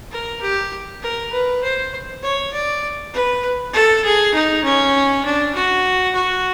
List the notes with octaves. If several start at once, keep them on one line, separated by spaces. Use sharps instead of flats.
A#4
G4
A#4
B4
C5
C#5
D5
B4
A4
G#4
D#4
C#4
D4
F#4
F#4